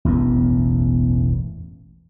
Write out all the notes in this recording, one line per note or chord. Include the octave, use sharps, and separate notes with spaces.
E1 A1 F#2 B3